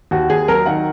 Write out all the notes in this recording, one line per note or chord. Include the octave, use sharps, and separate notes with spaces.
D#2 F#4
D#2 G#4
F#3 A#4
D#3 F#5